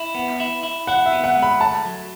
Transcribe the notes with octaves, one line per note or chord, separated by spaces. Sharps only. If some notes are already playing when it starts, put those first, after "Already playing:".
Already playing: E4
B3
E4
E4
E4 F#5
E5
B3
F#5
G#3
B5
A3 A5
F#3